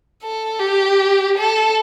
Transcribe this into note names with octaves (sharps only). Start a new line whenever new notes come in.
A4
G4
A4